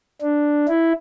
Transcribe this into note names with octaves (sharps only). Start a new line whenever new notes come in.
D4
E4